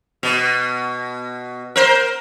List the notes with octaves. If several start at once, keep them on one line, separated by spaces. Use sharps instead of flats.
B2
A#4 C5